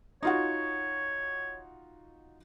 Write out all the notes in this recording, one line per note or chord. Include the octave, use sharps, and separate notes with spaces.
D#4 F4 F#4 C#5